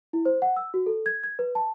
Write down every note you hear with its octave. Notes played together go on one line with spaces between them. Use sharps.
E4
C5
F#5
E6
F#4
A4
G#6
G#6
B4
A5